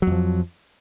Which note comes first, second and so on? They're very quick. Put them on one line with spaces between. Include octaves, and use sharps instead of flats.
F#3 F2 F3